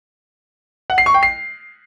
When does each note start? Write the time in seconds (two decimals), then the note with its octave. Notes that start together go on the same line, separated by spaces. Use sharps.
0.90 F#5
0.98 C7
1.06 C#6
1.14 G5
1.23 C7